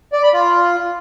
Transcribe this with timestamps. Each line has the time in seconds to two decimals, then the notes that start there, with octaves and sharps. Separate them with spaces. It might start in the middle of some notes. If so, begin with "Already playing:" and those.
0.13 D5
0.23 B5
0.33 F4